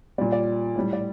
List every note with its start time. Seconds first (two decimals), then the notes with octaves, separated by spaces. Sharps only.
0.18 A#2 G3 D5
0.32 D5
0.76 A2 G3
0.93 D5